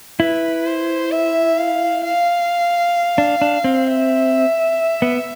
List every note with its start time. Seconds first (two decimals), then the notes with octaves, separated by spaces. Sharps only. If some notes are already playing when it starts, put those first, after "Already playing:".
0.20 E4 B4
0.66 C5
1.11 E5
1.58 F5
2.04 F5
3.18 D4
3.42 D4
3.64 C4
3.87 E5
5.02 B3